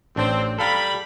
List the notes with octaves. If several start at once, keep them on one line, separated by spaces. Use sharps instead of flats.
A1 C4 D4 G5
G3 A4 F5 A#5 B5